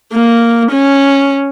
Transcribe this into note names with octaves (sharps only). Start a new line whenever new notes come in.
A#3
C#4